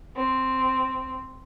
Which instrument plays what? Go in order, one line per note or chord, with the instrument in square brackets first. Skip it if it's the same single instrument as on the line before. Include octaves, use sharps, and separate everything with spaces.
[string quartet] C4